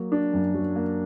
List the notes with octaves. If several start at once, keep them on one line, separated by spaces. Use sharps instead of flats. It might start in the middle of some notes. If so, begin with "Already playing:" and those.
Already playing: F#3 A#3
D4
F#2
F#3
A#3